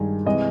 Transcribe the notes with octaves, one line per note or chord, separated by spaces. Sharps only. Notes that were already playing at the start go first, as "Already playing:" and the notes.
Already playing: G2 D#3 G#3
C3 E3 G#3 D#5